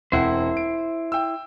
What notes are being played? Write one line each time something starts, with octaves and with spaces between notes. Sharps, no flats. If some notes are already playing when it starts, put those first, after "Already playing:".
E1 C4 E4 C5 F#5
D7
G5 E6